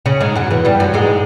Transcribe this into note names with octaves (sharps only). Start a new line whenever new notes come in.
C#3 C#4
G#2 G#3
F#2 F#3
E2 E3
G2 G3
F#2 F#3
G#2 G#3